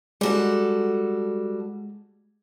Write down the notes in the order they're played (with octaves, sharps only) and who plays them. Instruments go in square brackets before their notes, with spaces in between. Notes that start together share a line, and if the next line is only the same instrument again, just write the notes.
[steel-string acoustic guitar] G3 F#4 A4 [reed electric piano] G#3